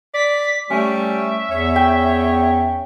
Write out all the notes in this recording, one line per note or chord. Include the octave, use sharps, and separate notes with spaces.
D5 B6
G3 A3 C#4 E5
E2 C#5
G5